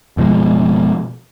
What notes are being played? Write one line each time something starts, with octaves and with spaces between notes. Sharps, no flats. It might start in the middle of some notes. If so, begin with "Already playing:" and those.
F#1 B2 F3 G#3